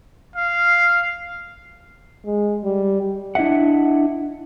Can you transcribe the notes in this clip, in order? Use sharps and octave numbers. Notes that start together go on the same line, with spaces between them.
F5
G#3
G3
D4 E4 D#5 E5 F#5